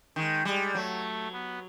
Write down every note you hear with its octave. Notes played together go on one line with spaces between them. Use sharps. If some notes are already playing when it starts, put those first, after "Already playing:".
D#3 G#3
G3 G#3
F#3 A3
B3